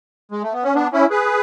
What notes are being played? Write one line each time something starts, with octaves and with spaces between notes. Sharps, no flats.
G#3
A3
B3
C#4
B3 D4
C#4 E4
G#4 B4